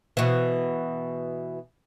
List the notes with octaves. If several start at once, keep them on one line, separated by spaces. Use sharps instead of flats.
B2 E3